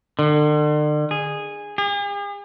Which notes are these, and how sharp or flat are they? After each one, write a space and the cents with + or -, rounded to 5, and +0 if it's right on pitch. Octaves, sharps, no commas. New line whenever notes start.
D3 +40
G#4 -10
G#4 -45